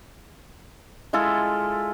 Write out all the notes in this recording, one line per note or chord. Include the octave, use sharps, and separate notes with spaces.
G#3 E4 F4 A4